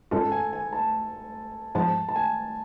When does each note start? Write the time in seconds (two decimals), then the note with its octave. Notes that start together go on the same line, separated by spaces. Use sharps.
0.11 G#2 G#3 C#4 F4 A4
0.32 G#5
0.53 G#5
0.73 A5
1.75 G#2 F3 G#3 B3 A5
2.09 A5
2.16 G#5